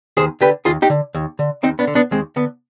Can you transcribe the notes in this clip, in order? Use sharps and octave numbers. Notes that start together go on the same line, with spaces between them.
D#2 G#4 C5
D3 G4 B4
D#2 F4 G#4
D#4 G4
D3
D#2
D3
D#2 C4 D#4
B3 D4
D3
B3 D4
D#2 G#3 C4
D3 B3